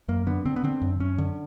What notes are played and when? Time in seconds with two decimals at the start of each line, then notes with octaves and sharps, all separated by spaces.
0.08 F#2 A#3
0.27 D3 B3
0.46 D3 C4
0.56 B3
0.64 D3 C4
0.82 F#2
1.00 F#2 C#4
1.18 D3